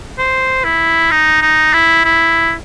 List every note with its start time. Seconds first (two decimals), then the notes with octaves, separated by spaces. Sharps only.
0.18 C5
0.64 E4
1.11 D#4
1.42 D#4
1.73 E4
2.04 E4